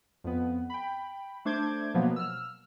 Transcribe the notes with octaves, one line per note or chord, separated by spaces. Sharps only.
F2 B3
G5 B5
A3 D4 C5 D6 G6 G#6
B2 F3 F#3 A#3 B3
E6 F6